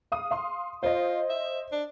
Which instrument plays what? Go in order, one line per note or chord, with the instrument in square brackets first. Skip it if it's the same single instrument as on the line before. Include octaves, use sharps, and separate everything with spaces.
[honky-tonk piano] F5 D#6
F5 C6
[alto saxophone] F4 [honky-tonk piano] C5 D#5
[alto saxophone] E5
D4